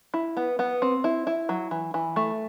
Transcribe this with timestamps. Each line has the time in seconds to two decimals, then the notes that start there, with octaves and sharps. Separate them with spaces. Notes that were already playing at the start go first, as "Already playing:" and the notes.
0.14 E4
0.37 B3
0.59 B3
0.82 C4
1.04 E4
1.27 E4
1.49 F#3
1.71 E3
1.94 E3
2.16 A3